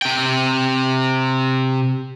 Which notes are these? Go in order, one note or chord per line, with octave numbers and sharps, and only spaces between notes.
C3 G5